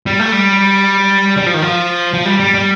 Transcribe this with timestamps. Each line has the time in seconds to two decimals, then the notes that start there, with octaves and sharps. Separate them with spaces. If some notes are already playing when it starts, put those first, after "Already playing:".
0.06 G3
0.19 A3
0.32 G3
1.37 G3
1.46 F3
1.54 D#3
1.62 F3
2.14 F3
2.26 G3
2.40 G3
2.54 G3